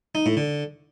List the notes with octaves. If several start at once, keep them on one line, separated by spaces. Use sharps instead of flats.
D#4
A2
D3